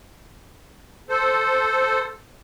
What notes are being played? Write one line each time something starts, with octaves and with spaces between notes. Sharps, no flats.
A4 C5